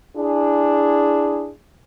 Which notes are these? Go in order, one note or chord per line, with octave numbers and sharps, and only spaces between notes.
D4 E4 G#4